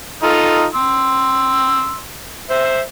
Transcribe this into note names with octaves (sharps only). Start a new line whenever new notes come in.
D#4 F4 A4
C6 E6
C5 E5